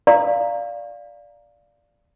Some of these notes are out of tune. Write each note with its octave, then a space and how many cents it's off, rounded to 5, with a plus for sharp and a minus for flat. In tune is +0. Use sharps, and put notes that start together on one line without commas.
D5 +0 F5 +0 A#5 -10